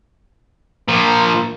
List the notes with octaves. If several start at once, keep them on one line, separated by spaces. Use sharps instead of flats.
A#2 F3